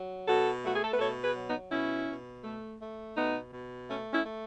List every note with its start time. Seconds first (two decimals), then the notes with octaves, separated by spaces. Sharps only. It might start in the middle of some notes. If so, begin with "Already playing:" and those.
Already playing: F#3
0.27 B2 F#4 A4
0.64 A3 F#4
0.74 G#4
0.83 A4
0.91 B4
0.99 B2 A4 C#5
1.24 G#4 B4
1.35 F#3
1.48 B3 D#4
1.71 B2 C#4 E4
2.08 B2
2.44 A3
2.81 A3
3.16 B2 B3 D#4
3.52 B2
3.89 A3 C#4
4.13 C#4 E4
4.26 A3